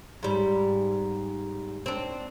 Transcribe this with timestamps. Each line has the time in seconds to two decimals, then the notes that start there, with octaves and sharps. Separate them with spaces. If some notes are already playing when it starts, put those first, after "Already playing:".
0.23 G#2 G3
1.86 C4 D4